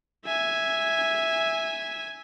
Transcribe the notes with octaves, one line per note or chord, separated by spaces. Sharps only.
E5 G#5